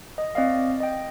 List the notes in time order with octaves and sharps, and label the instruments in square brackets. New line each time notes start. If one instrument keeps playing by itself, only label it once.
[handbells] D#5
C4 D5 D#5 F5
D#5 G5